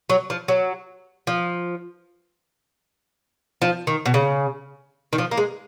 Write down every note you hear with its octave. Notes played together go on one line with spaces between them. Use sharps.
F#3
F3
F#3
F3
F3
D#3
B2
C#3
D#3
F3
A#3
G#3